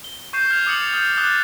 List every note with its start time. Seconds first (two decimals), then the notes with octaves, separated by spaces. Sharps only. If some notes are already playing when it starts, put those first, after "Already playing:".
0.04 G7
0.33 C#6 G6 C7 E7
0.51 F6 G#6 C7 F7
0.66 D6 D#6 A6 C#7 F7 F#7
0.93 D#6 F6 G6
1.17 D6 D#6 F6 F#6 A6 G7